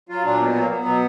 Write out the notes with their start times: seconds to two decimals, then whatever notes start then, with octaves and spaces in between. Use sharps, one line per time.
0.09 F#3 F4
0.24 A#2 D4
0.39 B2 B3
0.50 B3
0.55 F#3
0.60 A#3
0.70 F#3 B3
0.85 B2